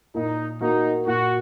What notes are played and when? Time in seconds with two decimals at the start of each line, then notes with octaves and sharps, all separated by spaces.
0.15 A#2 D#4
0.61 A#3 D#4 F#4
1.06 A#2 F#4